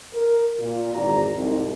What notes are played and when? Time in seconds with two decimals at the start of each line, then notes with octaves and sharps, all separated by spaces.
0.14 A#4
0.59 A#2
0.93 G#1 E2 F#4 D5 A#5
1.35 C2 F2 G#2